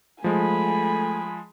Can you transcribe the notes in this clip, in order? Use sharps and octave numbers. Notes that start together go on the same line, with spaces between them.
F3 G#3 A3 G#5 B5